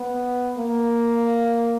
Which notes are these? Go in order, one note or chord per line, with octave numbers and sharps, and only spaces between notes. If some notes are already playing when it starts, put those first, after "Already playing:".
Already playing: B3
A#3